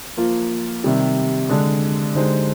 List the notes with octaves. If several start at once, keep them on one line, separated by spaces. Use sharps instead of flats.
F3 A#3 F4
C3 D#3 G3 C4 G4
D3 G#3 D4
D3 G#3 D#4 G4 C5